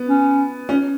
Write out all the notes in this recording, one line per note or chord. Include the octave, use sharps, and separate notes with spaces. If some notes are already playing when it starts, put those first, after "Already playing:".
Already playing: B3
C#4
C#4